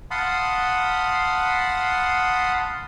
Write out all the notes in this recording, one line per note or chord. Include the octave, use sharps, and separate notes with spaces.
F5 F#5 A5 B5 C6 D#6